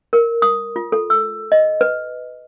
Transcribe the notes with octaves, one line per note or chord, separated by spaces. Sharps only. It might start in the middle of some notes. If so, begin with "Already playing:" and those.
A#4
D#6
F4
A4
E6
D#5
B4